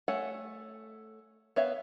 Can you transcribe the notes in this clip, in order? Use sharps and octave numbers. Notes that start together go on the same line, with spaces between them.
A3 C#5 F#5 G#5
B3 C#5 E5 F5